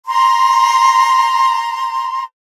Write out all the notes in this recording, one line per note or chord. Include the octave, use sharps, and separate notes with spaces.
A#5 C6